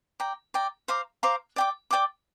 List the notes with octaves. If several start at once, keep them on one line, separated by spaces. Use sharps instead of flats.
D5 G5 A#5
D5 G5 A#5
C5 F5 A#5 D6
C5 F5 A#5 D6
D5 G5 D6
D5 G5 D6